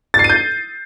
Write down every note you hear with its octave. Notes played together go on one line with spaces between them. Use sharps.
A6
C7
D#7
G6